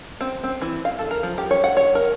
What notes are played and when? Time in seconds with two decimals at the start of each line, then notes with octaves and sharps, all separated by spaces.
0.21 C4
0.44 C4
0.62 E3
0.85 F5
0.99 A4
1.11 A#4
1.23 F3
1.38 G4
1.51 C#5
1.64 F#5
1.77 C#5
1.95 A#4